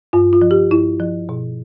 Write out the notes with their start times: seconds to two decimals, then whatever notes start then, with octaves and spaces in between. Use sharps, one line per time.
0.13 G2 F4
0.33 F4
0.41 F3
0.51 G4
0.71 G2 E4
1.00 F3
1.29 B2